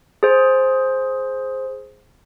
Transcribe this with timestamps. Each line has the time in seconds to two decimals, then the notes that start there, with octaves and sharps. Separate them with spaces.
0.23 G#4 C5